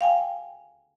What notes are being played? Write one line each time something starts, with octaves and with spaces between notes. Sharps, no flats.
F5 G5 G#5